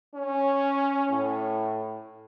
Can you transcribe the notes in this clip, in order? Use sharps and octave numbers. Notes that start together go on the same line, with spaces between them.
C#4
A2